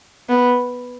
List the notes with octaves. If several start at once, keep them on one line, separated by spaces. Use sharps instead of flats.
B3